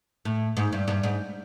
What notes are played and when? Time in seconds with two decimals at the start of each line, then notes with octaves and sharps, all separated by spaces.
0.25 A2
0.57 G#2
0.73 G2
0.88 G2
1.03 G#2